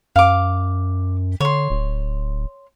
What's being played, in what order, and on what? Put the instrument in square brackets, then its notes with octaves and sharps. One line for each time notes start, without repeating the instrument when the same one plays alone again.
[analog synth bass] F#2 [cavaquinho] F5 D6
[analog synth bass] D3 [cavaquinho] C#5 C6
[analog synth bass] D1